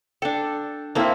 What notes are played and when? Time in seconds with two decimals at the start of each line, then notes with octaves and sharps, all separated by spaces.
0.22 D4 A4 G5
0.95 A#3 C4 E4 A4 C5 F5